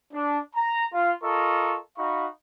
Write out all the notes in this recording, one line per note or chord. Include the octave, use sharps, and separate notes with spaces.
D4
A#5
F4
F4 A4 A#4 D#5 C#6
D#4 F#4 F5 B5 C#6